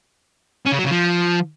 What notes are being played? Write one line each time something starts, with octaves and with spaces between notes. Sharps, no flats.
C#4
C#3
F#3
C#3
F3